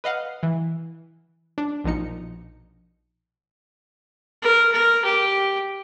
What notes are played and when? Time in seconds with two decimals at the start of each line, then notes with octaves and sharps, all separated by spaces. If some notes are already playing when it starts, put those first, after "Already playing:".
0.04 B4 D#5 F5 F#5
0.43 E3
1.58 D4
1.84 A#1 B2 F3 D#4 C#7
4.42 A#4
4.72 A#4
5.05 G4